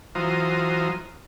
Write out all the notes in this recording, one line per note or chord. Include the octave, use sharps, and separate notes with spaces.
E3 F#3 F4 C5 A#5 D#6